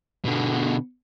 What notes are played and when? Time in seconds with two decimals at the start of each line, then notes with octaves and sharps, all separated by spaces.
0.25 B2 D3